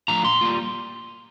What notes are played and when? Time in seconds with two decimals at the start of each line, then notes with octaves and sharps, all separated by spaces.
0.08 F3 A3 D4 F4 A#5
0.25 A#2 C6
0.41 G3 A#3 F4